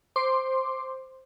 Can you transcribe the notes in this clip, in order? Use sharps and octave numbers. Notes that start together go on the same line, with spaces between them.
C5 C6 D6